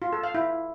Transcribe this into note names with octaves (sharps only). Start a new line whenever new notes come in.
F4
A4
F5
E4